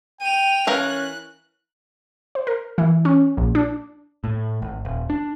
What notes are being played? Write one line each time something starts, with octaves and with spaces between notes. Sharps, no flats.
G5 D#7 F7
E3 C#4 A#4 F5 F#6
C5
A#4
E3
C#4
A#1
D4
A2
G#1
D#1
D4